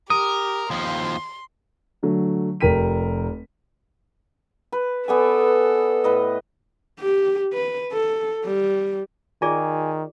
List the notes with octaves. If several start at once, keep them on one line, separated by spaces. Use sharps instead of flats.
G4 A#4 D#6
D#2 F3 C6
D3 F#3 A3
F1 A#4 G5 B6 D#7
B4
B3 A4 D5 G#5
A2 B4 D#5
G4
B4
A4
G3
D#3 F4 G#4 D5 G#5